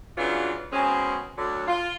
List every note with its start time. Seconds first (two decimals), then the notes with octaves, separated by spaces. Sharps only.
0.17 C#3 E3 F#3 D4 F4
0.72 B2 G#3 C4 C#4
1.38 D2 D3 F#3
1.68 F4